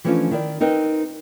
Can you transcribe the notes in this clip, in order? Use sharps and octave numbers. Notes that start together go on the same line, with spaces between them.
E3 F3 A3 C#4 D4 F4
D#3 E4 A#4 D5
C4 D#4 A#4 B4 D#5